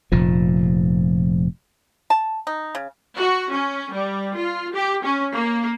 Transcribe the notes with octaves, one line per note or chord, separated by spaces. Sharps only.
F1 A#2 F3
A5
D#4
C#3
F#4
C#4
G3
F4
G4
C#4
A#3